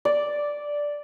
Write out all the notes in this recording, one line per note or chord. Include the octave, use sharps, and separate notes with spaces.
D5